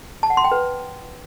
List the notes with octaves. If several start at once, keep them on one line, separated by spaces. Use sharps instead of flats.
A5
F#5
C6
G5
B4